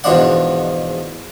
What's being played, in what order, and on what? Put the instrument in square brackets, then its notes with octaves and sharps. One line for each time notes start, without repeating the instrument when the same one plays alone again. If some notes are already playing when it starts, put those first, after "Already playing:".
[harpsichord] E2 G#2 B2 F3 D4 F#5